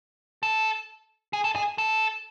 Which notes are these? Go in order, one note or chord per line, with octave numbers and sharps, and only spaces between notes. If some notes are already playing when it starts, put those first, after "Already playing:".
A4
G#4
A4
G#4
A4